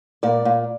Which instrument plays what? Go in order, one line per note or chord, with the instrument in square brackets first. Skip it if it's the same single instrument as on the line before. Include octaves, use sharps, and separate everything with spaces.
[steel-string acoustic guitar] A#2 D5
A#2